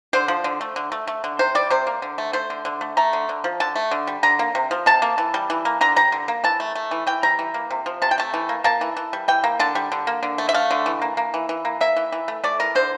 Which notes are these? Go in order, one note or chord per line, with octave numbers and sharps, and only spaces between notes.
D3 C5
F3
D3
A3
D3
A3
A3
D3
C3 C5
G3 D5
C3 C5
A#3
D3
A3
A3 C5
D3
D3
A3
A3 A#5
D3
D3
F3
D3 A5
A3
D3
G3
D3 A#5
A#3
C3
F3
C3 A5
A#3
E3
G3
E3
A#3
D3 A#5
G3 A#5
D3
A#3
E3 A5
A3
A3
E3
E3 G5
G3 A#5
E3
A#3
C3
F3
C3 A5
G5
A3 A5
E3
A#3
A#3 A5
E3
E3
G3
E3 G5
A#3
D3 A5
G3
D3
A#3
D3
A3
E5
A3 F5
D3
E3
A#3
A#3
E3
E3
A#3
A#3 E5
E3
E3
A3
A3 D5
E3 A#4
D3 C5